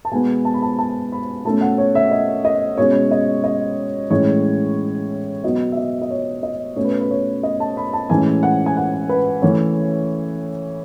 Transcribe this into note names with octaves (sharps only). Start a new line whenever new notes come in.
A5
B2 G#3 B3 G#5
A5
B5
A5
A5
B5
B2 A3 C#4 A5
F#5
C#5
E5
D#5
D#5
B2 G#3 C#4 C#5
D#5
D#5
A2 E3 G#3 C#4 C#5
B2 F#3 B3 D#5
E5
D#5
D#5
C#5
D#5
B2 A3 C#4 C#5
B4
B4
C#5
D#5
A5
B5
A5
A2 E3 G#3 C#4 G#5
F#5
G#5
F#5
B4
C#3 E3 A3 C#4 C#5